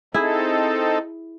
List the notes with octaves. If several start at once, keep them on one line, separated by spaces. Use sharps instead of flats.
C4 D#4 E4 G#4 A4